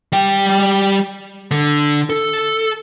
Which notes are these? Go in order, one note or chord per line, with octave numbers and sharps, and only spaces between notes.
G3 G5
D3
A4